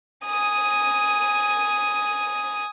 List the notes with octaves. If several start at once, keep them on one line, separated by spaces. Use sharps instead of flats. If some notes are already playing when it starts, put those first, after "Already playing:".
G#5 D#6